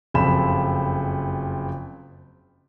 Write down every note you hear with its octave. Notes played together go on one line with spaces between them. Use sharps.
F#1 F2 F3 C4 B5 E7